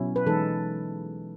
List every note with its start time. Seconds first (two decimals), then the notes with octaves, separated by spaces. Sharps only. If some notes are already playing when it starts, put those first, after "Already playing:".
Already playing: B2 F#3 C#4 E4
0.16 B4
0.27 E3 G#3 D#4 A4